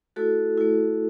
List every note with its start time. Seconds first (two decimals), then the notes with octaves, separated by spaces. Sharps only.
0.16 A3 E4 F#4 A4
0.58 A3 E4